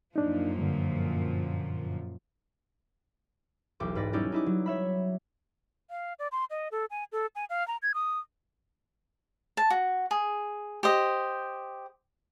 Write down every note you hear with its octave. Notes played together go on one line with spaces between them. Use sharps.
F#2 A#2 F3 D4 D#4
G2 D3
E1 B1 G4 D6
G#2 B4 D5 A#6
G3 C#4 D#4 E4 G4 D5
D#4 E4 D6
F#3
C#5 E5 B5
F5
D5
C6
D#5
A4
G#5
A4
G#5
F5
A#5
G#6
D#6
A5
F#4
G#4
G4 C5 D#5